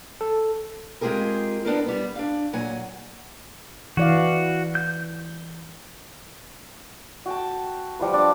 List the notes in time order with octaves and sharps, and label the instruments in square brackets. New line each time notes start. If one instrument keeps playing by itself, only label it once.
[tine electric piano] A4
[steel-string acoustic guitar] G#3 C4 F4 G4 G#4 A#4
B3 D4 D#4 A#4
G3 B3
D4 F5
A#2 F#3 F#5 G#5
[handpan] E3 D5 F5 [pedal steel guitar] F#4
[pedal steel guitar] G6
[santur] F#4 G5 A5
F3 G3 F4 B4
D4